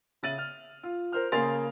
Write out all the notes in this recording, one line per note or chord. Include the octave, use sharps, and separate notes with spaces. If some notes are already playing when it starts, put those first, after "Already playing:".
C#3 E5 A6 D#7 F#7
F6
F4
A#4 C5 F6
C#3 A#3 G#4 C6 A6 F7